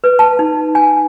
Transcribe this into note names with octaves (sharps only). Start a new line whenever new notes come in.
B4
A5
D#4
G#5